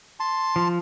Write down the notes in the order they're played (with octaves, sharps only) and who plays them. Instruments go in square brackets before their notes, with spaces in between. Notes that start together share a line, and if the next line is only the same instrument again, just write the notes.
[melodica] A5 C6
[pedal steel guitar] F3